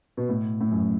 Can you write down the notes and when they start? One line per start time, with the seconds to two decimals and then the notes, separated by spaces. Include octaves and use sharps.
0.17 B2
0.29 A2
0.61 A2
0.71 F#2